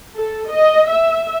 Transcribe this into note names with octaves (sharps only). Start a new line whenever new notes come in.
A4
D#5
E5